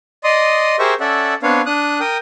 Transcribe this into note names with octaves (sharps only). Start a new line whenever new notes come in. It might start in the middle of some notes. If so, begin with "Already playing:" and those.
D5 D#5 C6 D#6
G4 G#4 A#4 C5 E5 C#6
C#4 A4 D5 E5 F#5
B3 C4 D4 B4 C#5 F5
D4 D#6 F#6
A#4 G5 D#6